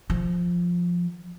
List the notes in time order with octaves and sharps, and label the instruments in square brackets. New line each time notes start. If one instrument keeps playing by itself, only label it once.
[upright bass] F3